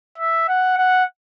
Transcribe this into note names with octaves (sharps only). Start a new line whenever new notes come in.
E5
F#5
F#5